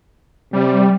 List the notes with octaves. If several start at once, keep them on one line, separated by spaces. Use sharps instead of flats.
C3 G3